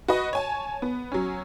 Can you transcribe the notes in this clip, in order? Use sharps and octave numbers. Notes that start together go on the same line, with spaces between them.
F#4 B4 D#5
C#5 G#5 A5
B3
F#3 C#4